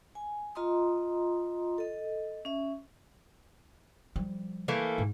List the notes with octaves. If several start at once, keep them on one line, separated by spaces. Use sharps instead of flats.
G#5
F4 D#5 A#5 C6 D#6
A4 D#5
C#4 E5
F3 G3
E3 A3 A#3
G#2